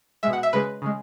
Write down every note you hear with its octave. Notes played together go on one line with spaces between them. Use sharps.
B2 G#3 E5
F#5
E5
C#3 G#3 B4
C#3 G#3